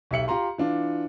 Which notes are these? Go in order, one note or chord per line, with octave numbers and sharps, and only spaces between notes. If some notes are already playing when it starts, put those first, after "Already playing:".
B1 G4 E5 C#7 F#7
F4 G4 A#5 C6
E3 D4 F4